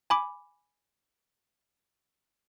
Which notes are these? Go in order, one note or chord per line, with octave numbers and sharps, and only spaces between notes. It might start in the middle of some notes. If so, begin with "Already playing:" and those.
G#5 B5 D6